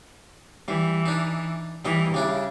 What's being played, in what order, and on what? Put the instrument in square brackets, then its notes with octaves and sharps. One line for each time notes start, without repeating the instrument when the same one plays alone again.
[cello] E3 [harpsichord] G3
[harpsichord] D4 D#4
[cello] E3 [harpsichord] G3 D#5
[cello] C#3 [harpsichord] G3 D4 E4